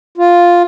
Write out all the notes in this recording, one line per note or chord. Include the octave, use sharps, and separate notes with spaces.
F4